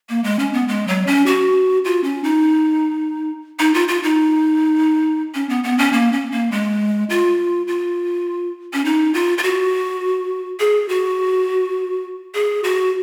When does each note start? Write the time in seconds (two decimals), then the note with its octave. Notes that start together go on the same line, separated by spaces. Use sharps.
0.09 A#3
0.24 G#3
0.39 C#4
0.53 B3
0.68 G#3
0.88 F#3
1.07 C#4
1.26 F#4
1.85 F4
2.04 C#4
2.24 D#4
3.59 D#4
3.74 F4
3.88 F4
4.03 D#4
5.35 C#4
5.49 B3
5.64 B3
5.78 C#4
5.93 A#3
6.13 C#4
6.32 A#3
6.52 G#3
7.10 F4
7.68 F4
8.73 C#4
8.85 D#4
9.14 F4
9.38 F4
9.43 F#4
10.60 G#4
10.89 F#4
12.34 G#4
12.64 F#4